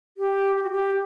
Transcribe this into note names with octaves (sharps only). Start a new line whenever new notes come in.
G4
G4
F#4
G4